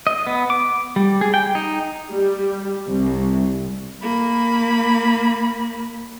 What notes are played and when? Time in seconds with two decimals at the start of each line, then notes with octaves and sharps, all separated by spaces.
0.07 D#5
0.27 B3
0.50 D6
0.96 G3
1.21 G#4
1.34 G5
1.55 D#4
2.10 G3
2.89 C2
4.02 A#3 B5